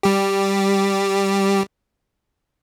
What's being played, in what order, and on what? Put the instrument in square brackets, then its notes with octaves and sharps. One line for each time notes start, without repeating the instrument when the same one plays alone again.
[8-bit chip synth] G3 G4